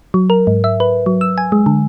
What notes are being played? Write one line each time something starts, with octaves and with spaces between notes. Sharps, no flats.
F#3
A#4
G#2
E5
B4
F#3
E6
G#5
G#3
D3